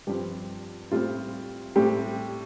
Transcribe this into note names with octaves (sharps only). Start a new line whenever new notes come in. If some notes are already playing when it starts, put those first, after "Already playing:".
G2 F3 C4 G4
A2 G3 C4 F4
A2 G3 C4 G4